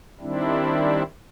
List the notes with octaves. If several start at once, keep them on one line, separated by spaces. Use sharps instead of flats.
D#3 G3 C4 D4 E4